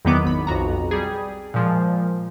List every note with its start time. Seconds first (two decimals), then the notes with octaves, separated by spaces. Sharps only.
0.05 E2 D#3 F#3 B3 D6
0.24 G#1 B5
0.47 B1 F2 F#4 A#5
0.91 G3 G#4
1.54 A#2 F3 G#3